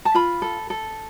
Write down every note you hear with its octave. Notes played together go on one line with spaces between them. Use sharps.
A5
F4 B5
A4
A4